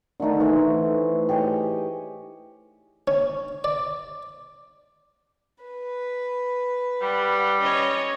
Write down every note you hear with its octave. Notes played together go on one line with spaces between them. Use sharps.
D3 D#3 A3 D#4
E3 A3 C5 D#5
G4 G#4 C#5 D#5
C#4
D5
B4
G3 F#5
C#4 C#5 D#5